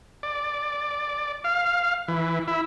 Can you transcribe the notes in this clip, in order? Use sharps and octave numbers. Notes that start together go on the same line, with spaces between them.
D5
F5
E3
E4